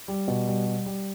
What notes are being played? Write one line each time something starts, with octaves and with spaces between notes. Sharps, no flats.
G3
B2
G3
G3
G3